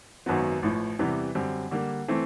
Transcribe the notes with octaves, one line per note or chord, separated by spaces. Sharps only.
G#1 F#2 D#3 F#3 B3
A1 A2 F3
E2 C3 E3 G3 B3
F#2 D3 G3 C4
D3 G3 A#3
E3 A3 C4